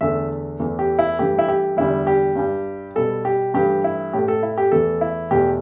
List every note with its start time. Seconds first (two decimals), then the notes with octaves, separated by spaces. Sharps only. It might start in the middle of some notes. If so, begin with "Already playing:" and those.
0.01 E2 D3 A3 E5
0.60 E2 E3 A3
0.79 G4
0.99 E4
1.19 G2 E3 A3 G4
1.39 E4
1.48 G4
1.77 E2 D3 G3 E4
2.07 G4
2.36 G2 G3
2.95 B2 G3 A4
3.25 G4
3.54 G2 E3 A3 G4
3.84 E4
4.13 A2 A3 G4
4.28 A4
4.43 E4
4.58 G4
4.72 E2 E3 A3 A4
5.01 E4
5.31 E2 B2 A3 G4